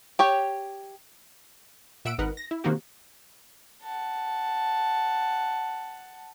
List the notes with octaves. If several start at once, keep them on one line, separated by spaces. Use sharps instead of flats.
G4 C#5 G5
A#2 E5 F#5 E6 D7
G#1 D#4 A#4 B4 F#5
A#6
E4
B2 D#3 A#3 C4 F#4 G4
F#5 A5